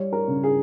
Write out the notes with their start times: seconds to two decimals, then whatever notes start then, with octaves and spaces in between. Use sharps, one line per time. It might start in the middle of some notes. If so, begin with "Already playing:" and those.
Already playing: G3 C#5
0.13 A#4
0.28 C#3
0.43 G#4